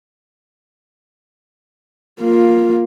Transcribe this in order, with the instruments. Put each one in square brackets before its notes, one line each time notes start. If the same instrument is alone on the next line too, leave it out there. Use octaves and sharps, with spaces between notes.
[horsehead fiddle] A#3 F4